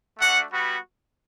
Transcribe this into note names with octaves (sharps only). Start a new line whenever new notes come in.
A3 D4 F#4 F#5
G3 B3 F#4